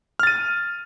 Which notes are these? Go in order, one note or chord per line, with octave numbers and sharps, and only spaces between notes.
F6 A6 D#7